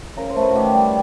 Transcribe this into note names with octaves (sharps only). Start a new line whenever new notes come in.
C#3 A#4
C5
A3
B4
F#4
D#3 G4
G3